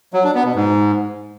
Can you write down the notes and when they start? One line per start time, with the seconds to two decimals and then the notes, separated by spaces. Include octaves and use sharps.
0.13 F#3
0.24 D4
0.34 B3
0.45 B2
0.55 G#2